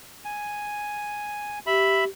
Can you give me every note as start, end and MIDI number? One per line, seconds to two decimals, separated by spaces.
0.25 1.59 80
1.67 2.07 67
1.67 2.04 76
1.67 2.04 83